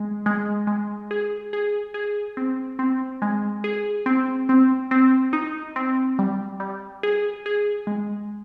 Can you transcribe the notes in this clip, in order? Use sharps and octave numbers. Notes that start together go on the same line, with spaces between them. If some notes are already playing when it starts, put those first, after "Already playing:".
Already playing: G#3
G#3
G#3
G#4
G#4
G#4
C4
C4
G#3
G#4
C4
C4
C4
D#4
C4
G3
G3
G#4
G#4
G#3